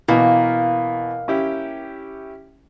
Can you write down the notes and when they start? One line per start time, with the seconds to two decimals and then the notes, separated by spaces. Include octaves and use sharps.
0.08 B2 E3 A#3
1.28 C#4 E4 G4